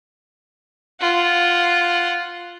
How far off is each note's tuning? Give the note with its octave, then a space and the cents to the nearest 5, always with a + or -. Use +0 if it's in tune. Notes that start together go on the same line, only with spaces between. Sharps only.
F4 +0 F#5 +0